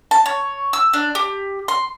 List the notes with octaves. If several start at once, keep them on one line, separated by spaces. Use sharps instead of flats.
A5
C#5
E6
D4
G4
C6